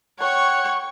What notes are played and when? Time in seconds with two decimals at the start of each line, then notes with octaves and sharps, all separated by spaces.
0.20 C#5 F#5 G5 C#6